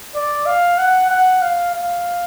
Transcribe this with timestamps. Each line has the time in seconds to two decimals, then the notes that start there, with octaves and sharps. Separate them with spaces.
0.15 D5
0.46 F5
0.78 F#5
1.10 F#5
1.42 F5
1.75 F5